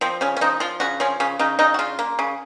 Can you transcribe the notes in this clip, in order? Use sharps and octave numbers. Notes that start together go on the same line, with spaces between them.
F3 C4
C#3 C#4
C#4
F3 D#4
F3 F4
C#3 F#4
F3 C#4
C#3 C#4
C#3 D#4
C#3 D#4
F#4
C#3 F4
A#3
C#3